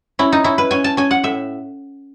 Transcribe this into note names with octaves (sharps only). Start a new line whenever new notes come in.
C#4 E4
D#4
C#4 E4
B4
C#4 G#5
A5
C#4 G#5
F#5
A2 E5